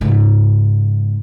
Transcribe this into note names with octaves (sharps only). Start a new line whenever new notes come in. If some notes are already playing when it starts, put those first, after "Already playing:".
G#2 C#3